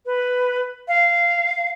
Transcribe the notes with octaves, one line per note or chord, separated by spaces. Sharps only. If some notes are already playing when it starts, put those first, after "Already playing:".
B4
F5